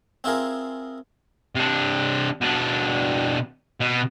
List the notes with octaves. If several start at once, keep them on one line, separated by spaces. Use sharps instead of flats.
C4 E4 F4 G#4 A#4
C3 D4
B2 D4
B2